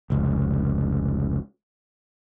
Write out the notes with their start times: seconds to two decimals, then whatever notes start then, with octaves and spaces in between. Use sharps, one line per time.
0.10 F1 C#2